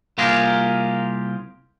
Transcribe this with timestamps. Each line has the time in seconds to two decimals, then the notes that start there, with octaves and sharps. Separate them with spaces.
0.18 C2 A#3 F4 G4 G#4 A#4